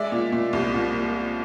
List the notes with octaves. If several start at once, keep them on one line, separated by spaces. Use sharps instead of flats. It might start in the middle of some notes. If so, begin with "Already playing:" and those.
Already playing: G#3 D5 E5
A#2
A#2
C2
A#2